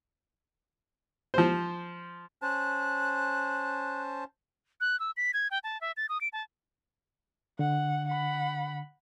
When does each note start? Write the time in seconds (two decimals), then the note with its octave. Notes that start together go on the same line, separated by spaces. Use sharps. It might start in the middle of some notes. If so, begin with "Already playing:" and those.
1.34 F3 C5
2.42 C#4 C5 A5 F#6
4.81 F#6
5.00 E6
5.17 B6
5.34 G#6
5.51 G5
5.64 A5
5.81 E5
5.97 A6
6.09 D#6
6.21 D7
6.33 A5
7.59 D3 F#5
8.08 F#5 B5